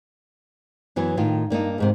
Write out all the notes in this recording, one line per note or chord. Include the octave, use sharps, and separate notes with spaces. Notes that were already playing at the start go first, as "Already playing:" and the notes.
F#2 E3 F#3 B3
A2 D#3 F4
G2 A#3 D4 D#4
D#2 G#2 C3